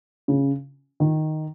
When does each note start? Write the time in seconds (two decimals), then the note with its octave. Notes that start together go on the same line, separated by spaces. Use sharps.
0.28 C#3
1.00 D#3